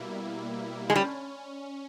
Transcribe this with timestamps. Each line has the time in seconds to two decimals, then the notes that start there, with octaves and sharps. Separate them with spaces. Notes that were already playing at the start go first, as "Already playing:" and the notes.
Already playing: B2 G3 A#3 E4
0.90 G#3
0.96 G3 C#4